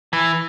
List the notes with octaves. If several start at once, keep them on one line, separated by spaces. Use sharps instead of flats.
E3